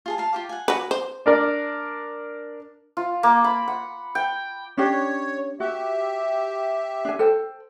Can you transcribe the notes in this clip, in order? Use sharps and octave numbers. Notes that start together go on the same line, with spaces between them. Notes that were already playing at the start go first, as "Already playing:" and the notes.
F4 G#4 A5
F5 A5 A#5
F4 G4 D6
F#5 G#5
F#4 B4
C5
D4 A#4 D5
F4
A#3
B5
F#5
G5
C#4 D4 G4 C#5
F#4 G4 E5
D4 G#5
A4 C5 G5